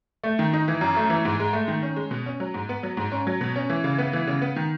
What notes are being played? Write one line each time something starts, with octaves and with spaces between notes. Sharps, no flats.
A3
D#3
D#4
E3
F#2
A3
E3
G#2
G#3
A3
D#3
C#4
G#3
B2
C#4
F#3
G#2
B3
F#3
G#2
C#4
F#3
B2
C#4
E3
C#3
B3
E3
C#3
B3
D#3